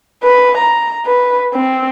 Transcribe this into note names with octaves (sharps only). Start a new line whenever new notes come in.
B4
A#5
B4
C4